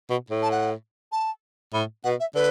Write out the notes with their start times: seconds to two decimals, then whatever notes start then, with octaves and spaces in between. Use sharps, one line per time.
0.10 B2
0.30 A2
0.42 A5
0.51 F#5
1.12 A5
1.74 A2 B5
2.04 B2 F#5
2.20 E5
2.35 D3 B4